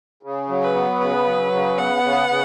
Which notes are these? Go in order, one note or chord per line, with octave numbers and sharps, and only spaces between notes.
C#3
F#3
B4
B3
C#3 B4
F#3
C#3
B3 F#5
C#3
C#3